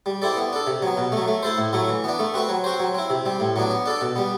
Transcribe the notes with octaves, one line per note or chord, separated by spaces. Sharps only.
G3
C4 E4 A4 D5
B3
D4 A4
C3
F#3 B3
B2
F#3 A3
A3
E4 A4 C5
A2
F#3 A3 E4
E3
B3 D4
A3
C4 F#4 B4
F#3
C4 F#4 C5
F#3
C4 E4
C3
G3 C4
A2
F#3 B3 D4
B3
D4 A4 D5
B2
G3 B3